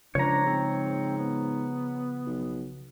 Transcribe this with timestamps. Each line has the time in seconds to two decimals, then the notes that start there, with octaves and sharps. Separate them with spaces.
0.15 C#2 C#3 F3 D4 C#5 A#5
0.45 G#2 C4
1.18 B3
2.27 B1